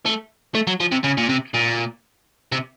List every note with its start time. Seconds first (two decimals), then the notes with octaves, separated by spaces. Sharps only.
0.06 A3
0.55 A3
0.67 F#3
0.80 F3
0.92 C3
1.04 C#3
1.18 A#2
1.29 C3
1.54 A#2
2.52 C3